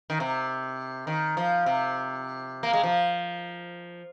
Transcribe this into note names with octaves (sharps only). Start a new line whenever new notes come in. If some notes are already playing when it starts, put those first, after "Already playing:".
D#3
C3
D#3
F3
C3
A#3
G#3
F3